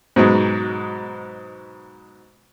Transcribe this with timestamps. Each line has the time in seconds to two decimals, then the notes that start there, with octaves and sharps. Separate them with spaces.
0.16 G#2 B2 F#3 G#3